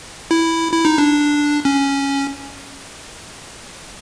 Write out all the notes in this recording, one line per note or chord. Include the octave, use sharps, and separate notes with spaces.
E4
E4
D#4
D4
C#4